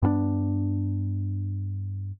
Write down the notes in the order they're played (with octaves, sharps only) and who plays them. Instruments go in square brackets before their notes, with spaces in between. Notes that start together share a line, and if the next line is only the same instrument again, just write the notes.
[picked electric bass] G2 B3 C#4 D4